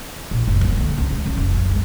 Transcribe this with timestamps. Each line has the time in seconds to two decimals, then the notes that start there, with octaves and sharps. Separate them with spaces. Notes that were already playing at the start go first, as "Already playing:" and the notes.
0.31 A#1
0.47 F#1
0.61 A#3
0.77 D3
0.98 C#2
1.11 A3
1.26 C#4
1.37 F#1
1.55 F#2
1.71 G#3